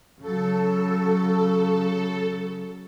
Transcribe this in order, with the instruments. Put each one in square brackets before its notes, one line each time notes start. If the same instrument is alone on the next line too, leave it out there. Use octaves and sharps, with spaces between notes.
[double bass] C#3 F#3 [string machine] A4